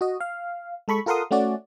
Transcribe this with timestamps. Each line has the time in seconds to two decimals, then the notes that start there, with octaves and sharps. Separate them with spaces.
0.01 F#4 D#5
0.20 F5
0.88 G#3 A4 B5 C#6
1.06 F4 A4 A#4 F#5 C6 D#6
1.31 A3 C#4 F#4 D5